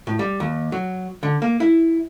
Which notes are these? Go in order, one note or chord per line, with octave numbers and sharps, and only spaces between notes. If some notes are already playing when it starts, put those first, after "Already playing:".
A2
G3
D#2
F#3
D3
A#3
E4